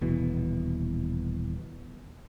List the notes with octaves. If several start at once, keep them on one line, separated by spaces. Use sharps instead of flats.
D#1 B2 E3